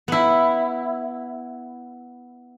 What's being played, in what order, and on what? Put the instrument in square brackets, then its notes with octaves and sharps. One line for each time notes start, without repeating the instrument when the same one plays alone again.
[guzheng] B3 E4